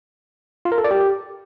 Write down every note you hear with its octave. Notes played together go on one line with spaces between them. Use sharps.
F4
A#4
A4
D5
G4